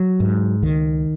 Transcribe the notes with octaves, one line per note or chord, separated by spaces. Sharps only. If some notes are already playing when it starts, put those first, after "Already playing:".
Already playing: F#3
G#2
C#2 D#3